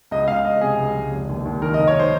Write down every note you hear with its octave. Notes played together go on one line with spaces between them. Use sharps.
C#2 D#5
C#2 F5
C#2 D#5
C3 G#4
C#2
C#2
F1
D#2
D#2
D#3 A#4
D#5
F1
C#5
C5